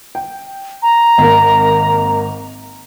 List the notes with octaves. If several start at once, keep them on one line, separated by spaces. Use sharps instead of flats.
G5
A#5
G#1 A#3